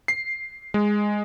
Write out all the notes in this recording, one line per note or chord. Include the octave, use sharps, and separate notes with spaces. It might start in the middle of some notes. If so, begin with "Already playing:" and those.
C7
G#3